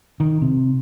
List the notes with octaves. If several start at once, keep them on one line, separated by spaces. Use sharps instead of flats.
D#3
C3